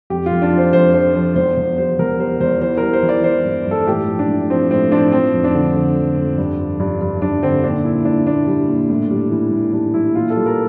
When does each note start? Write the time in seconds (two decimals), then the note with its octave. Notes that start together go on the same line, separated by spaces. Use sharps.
0.10 F2 G4
0.26 F4
0.31 F2
0.42 D4
0.53 F3 C5
0.73 F2 C5
0.93 F3 C5
1.15 F3 C5
1.35 E2 C5
1.57 E2
1.78 G3 C5
1.99 E2 A#4
2.19 G3 C5
2.40 E2 C5
2.61 E3 C5
2.77 G3 A#4
2.93 C5
3.03 E3
3.09 D5
3.24 E3 C5
3.45 G2
3.66 G2 A4
3.87 A2 G4
4.07 F3
4.19 D4
4.29 A2
4.50 F3 C4
4.71 A2 C4
4.92 F3 D4
5.12 F3 C4
5.34 F2
5.44 D4
5.54 D3
5.75 D3
5.96 F3
6.17 F2
6.38 G2
6.59 F3
6.80 G2
7.01 G2
7.22 G2 D4
7.43 D3 C4
7.63 A#2 D4
7.85 A#2 E4
8.05 A#2 D4
8.26 A#2 D4
8.47 G3
8.68 A#2
8.89 A2
9.11 G3
9.31 E3
9.52 A2
9.73 G3 D4
9.94 G3 E4
10.15 A#2 F4
10.30 A4
10.36 G3
10.46 A#4